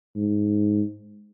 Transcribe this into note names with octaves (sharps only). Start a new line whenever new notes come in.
G#2